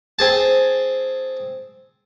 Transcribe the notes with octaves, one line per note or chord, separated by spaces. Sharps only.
C4 G#4 A5